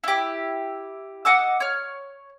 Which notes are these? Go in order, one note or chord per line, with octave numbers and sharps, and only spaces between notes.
E4 G4
D#5 F#5 D6 E6
C#5 F6